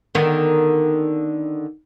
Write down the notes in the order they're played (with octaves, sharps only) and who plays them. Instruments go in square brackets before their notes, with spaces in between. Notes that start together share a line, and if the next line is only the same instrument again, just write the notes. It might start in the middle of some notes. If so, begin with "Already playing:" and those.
[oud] D3 D#3 B3